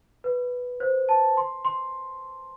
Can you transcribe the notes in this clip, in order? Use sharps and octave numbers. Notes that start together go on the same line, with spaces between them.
B4
C5
A5
C6
C6